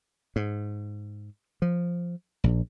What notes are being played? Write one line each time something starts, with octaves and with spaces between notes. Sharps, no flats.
G#2
F3
A#1